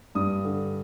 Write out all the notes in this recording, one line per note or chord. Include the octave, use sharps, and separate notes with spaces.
G2 D#6
D3